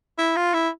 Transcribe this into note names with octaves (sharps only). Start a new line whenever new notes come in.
E4
F4
E4